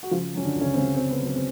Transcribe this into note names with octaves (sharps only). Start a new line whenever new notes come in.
F#4
C#3 F3 F4
F#3 C#4
D3 D4
C#2
C#3 C#4
C4
C#2 C#3 C#4
C4
C#3
B3
F#3 C4
C4